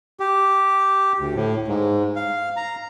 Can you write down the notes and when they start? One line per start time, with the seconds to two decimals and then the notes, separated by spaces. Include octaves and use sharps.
0.20 G4
1.19 D2
1.35 A2
1.68 G#2
2.15 F5
2.57 A#5